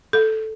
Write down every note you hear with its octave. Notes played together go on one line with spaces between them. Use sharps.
A4